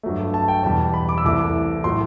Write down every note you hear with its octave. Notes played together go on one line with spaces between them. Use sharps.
G2 F#3 A3
A5
G5
E2 B2 G3 A5
B5
D6
E6
C2 C3 E3 A3 D6
A2 F#3 A3 C6